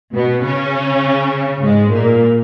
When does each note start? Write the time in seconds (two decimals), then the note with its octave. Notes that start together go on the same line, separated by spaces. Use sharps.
0.14 B2 B3
0.43 C#3 C#4
1.62 G#2 G#3
1.92 A#2 A#3